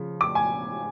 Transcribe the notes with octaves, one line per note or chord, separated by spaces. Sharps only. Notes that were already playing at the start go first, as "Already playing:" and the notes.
Already playing: C#3 F3
D6
G#5